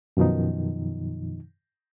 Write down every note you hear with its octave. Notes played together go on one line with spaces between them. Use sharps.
F#2 B2 D#3 F3 D#4